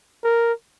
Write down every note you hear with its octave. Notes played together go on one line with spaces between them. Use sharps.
A#4